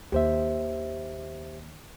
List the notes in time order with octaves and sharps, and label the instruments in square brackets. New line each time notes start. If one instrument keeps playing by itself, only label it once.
[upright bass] D#2 [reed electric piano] G4 C5 E5